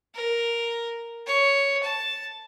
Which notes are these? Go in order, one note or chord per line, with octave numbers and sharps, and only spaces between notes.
A#4
C#5
A5